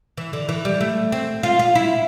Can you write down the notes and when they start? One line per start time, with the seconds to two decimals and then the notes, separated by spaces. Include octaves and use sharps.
0.17 E3
0.33 D3
0.49 E3
0.65 G3
0.81 A3
1.12 C4
1.43 F4
1.59 F4
1.75 E4